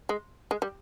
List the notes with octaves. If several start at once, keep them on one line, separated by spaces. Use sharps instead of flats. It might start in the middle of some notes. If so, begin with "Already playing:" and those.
G#3
G#3
G3